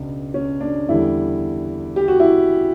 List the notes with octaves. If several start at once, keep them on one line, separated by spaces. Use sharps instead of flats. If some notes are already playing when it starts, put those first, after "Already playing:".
Already playing: C#2 B2 D4
C#4
D4
E2 D3 G3 E4
G4
F#4
E4